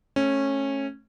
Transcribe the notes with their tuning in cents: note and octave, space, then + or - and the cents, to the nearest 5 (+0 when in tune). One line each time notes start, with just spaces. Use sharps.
A3 +0 C#4 -15